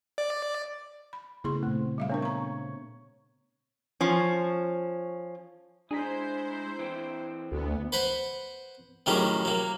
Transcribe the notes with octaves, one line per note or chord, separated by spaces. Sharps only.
D5
B5
C#3 A3 B3 E4 G#4 C6
A#2 A3 C4
G3 E5 F5
B3 D4 A#4 C#5
A#5 C#6
F3 C#4
G#3 D4 E4 G#4 C5 A#5 B6
E3 C4
D2 B3
B4 C5 F#5 B5
A2 D#3 F#3 G3 C#4 G#4
F#3 A#3